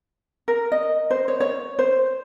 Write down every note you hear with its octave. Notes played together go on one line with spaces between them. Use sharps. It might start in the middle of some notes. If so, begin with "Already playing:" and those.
A#4
D#5
C5
C#5
C#5
C5